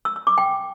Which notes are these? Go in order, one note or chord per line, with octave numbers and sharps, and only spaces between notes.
E6
E6
D6
G5